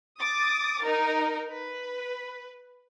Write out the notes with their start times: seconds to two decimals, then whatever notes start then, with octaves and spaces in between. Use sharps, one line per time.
0.18 D6 D#6 A6
0.82 D#4 A#4
1.49 B4